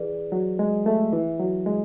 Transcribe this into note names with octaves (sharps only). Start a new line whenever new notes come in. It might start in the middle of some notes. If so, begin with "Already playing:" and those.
Already playing: E3 G#4 B4 D5
F#3
G#3
A3
E3
F#3
G#3